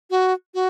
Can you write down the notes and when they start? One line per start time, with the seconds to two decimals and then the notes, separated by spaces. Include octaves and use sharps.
0.10 F#4
0.54 F#4